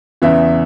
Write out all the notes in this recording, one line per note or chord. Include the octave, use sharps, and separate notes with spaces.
E2 C#3 E3 E5